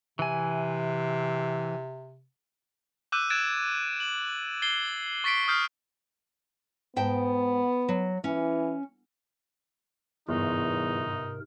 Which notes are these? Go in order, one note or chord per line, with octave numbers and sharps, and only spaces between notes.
C3 E3 G#5
D6 E6 F#6 G6 D#7
F#6 G#6 A6 D7 E7
F#7
G#6 A6 C7 G7
C#6 A6 B6 C7 D7
D#6 F6 G6 C7
G#2 B3 G5 A5
F#3
E3 C#4
G1 E2 G#2 C3 D#4 A#4